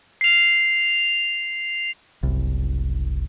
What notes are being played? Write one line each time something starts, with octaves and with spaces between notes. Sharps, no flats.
C7 F7
F#1 C2